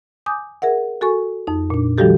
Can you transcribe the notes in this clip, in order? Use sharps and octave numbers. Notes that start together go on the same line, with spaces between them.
G#5 D6 D#6 G6
G#4 A#4 E5 F#5
F#4 A4 G#5 C#6
F2 D#4
A#2 D4
D#3 F3 G3 F#4 G4 A4